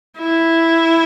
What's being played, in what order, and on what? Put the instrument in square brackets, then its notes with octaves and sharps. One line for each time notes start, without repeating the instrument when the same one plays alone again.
[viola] E4